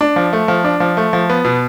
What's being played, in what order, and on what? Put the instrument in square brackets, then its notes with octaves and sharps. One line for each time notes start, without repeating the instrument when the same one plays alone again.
[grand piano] D4
F3
A3
F3
D4
F3
A3
F3
B3
B2